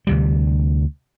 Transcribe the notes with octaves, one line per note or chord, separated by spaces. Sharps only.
D2 C3 G3